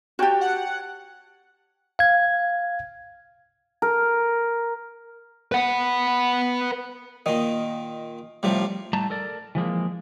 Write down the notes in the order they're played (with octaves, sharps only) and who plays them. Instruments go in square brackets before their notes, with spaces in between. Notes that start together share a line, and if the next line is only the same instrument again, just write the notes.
[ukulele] F#4 G4 [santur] C#5 G5 A5
[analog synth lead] F#5
[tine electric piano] F5 G#6
[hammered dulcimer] A#4
[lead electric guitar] B4 F#5
[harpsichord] A#2 D#3 [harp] D#5
[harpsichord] A2 C3 F3 [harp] G3
[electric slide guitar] A2 G3 A3 A5 A#5
A4 A#4 D5
E3 F3 G#3 A#3